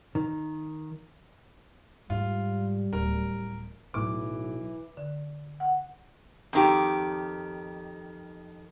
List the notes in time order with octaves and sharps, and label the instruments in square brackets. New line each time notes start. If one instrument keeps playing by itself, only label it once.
[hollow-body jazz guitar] D#3
[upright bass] G#2 [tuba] G3 [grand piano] F4
[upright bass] D1 E3 [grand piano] A#4
[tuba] B1 [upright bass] A2 F#3 [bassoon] E3 [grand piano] D6
[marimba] D3
F#5
[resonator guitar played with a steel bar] F2 D#3 G4